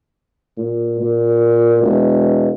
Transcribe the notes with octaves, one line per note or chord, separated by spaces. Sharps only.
A#2
A#2
E1